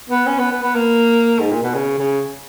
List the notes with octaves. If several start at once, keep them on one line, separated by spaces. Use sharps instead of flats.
B3
C#4
B3
B3
B3
A#3
G#2
A#2
B2
C#3
C#3